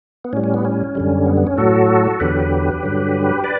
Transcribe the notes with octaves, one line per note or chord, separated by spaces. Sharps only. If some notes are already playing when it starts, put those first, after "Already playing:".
B3
A2 G3 C#4
C#4
B3
C#4
F#2 D3 G3
B3
B3
C#4
A2 F#3 F#4 A4
E2 D3 F#3 G4 B4
G2 D3 F#3
B4 D5